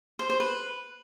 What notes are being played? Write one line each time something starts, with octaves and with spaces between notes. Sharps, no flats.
C5
C5
B4